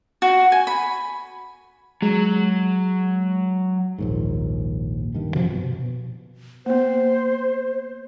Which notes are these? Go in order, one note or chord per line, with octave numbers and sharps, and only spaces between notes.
F#4
G#5
B5
F#3 G#3
A#1 D#2 G#2
G2 D#3
F#2 C3 F3 F#3
B2
A#3 B3 C5